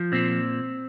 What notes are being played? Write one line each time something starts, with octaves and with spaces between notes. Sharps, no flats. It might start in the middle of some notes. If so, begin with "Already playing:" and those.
Already playing: F3
A#2 C4